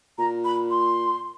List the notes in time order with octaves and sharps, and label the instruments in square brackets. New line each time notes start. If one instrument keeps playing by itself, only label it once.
[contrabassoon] A#2 [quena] A#5
[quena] B5
C6